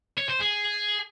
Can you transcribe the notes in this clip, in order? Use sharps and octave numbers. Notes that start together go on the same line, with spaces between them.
C#5
C5
G#4